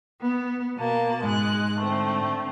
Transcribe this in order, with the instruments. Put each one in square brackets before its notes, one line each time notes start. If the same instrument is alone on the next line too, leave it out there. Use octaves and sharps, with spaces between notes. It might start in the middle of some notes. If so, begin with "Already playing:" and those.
[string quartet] B3
B2 A#3 A5
[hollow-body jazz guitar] G#2 [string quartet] G#3 F#6
[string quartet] D3 A3 C4